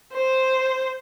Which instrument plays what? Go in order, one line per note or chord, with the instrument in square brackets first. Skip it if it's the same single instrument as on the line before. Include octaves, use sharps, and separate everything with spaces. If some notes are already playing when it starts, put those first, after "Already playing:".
[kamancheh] C5